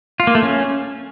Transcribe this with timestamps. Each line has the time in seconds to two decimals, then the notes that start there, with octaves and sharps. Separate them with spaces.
0.20 F4
0.27 A#3
0.35 A3
0.42 C#4